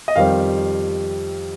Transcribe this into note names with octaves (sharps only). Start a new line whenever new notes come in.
D#5
F2 D#3 G3 C4 F5